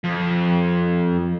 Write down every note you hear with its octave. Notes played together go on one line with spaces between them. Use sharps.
F2